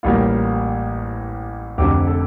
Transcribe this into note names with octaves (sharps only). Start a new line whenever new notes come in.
A1 A2 G3 A#3 F4
F1 F2 D3 G4
A4